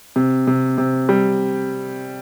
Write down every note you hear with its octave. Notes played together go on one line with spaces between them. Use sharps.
C3
C3
C3
G3